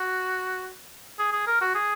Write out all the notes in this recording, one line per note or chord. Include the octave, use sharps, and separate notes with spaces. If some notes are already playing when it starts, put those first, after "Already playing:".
Already playing: F#4
G#4
G#4
A#4
F#4
G#4